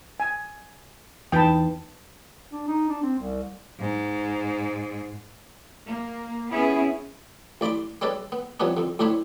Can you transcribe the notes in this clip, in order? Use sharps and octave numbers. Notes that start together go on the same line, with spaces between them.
G#5
E2 E3 D#4 B4 G5 A5 B5
D4
D#4
D4
C4
C2
G#2
A#3
B3 C#4 E4 G#4
A1 D5 B5 C6 D6
G3 G#3 C#4 A4 B4 D5
B3
C3 F3 G3 B3 C#4 D4
F2 D3
D2 A2 D4 C5 C#5 B5